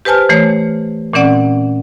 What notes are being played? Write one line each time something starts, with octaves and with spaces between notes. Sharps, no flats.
G4 B4 C5 G#5 A5 F6
E3 A3 C#5
A#2 E3 C4 C#4 D5 F#5